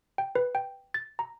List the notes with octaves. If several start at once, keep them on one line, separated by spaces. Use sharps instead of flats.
G5
B4
G5
A6
A#5